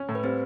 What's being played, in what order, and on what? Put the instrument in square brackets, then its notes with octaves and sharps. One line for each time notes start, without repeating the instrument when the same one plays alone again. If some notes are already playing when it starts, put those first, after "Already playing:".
Already playing: [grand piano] C#4
A2
[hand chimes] B4
[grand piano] G3 [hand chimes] C4 C5